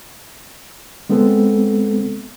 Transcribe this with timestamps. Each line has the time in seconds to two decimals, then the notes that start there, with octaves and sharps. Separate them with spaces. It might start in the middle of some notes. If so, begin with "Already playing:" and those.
1.09 G#3 B3 C4 A4